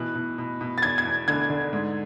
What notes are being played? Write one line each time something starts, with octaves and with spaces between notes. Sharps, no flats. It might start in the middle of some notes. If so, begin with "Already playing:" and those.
Already playing: B2 E3 F#6
B2
B2
B2
A6
E2 G#6
G#6
E2
D3 G#6
D3
G#2